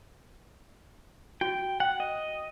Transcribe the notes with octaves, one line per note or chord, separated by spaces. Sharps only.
F#4 G5
F#5 G5
D#5